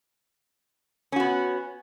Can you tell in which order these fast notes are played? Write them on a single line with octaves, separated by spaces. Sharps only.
C#4 F#4 B3